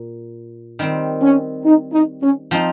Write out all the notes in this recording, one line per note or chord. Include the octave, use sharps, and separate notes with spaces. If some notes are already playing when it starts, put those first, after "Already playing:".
Already playing: A#2
D#3 G3 C4
C#4
D#4
D#4
C#4
F3 C4 D#4